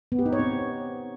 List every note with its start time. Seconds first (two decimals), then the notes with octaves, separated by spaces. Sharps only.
0.12 B3
0.19 G4
0.26 D#4
0.33 C#5
0.39 C4